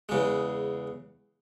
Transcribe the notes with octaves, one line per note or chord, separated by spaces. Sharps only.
E2 C#3 G#3